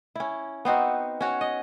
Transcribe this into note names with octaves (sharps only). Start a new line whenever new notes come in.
C#4 E4
B3 C4 D#4 F#4
C#4 F#4 C#5
D#5